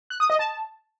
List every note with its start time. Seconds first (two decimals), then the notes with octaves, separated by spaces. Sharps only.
0.10 F#6
0.20 D#6
0.30 D#5
0.39 A5